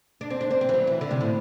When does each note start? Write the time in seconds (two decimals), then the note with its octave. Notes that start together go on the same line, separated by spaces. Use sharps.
0.21 D4
0.30 C4
0.41 D4
0.51 C4
0.61 C4
0.69 E3
0.74 F#3
0.87 E3
1.01 D3
1.11 C3
1.21 A2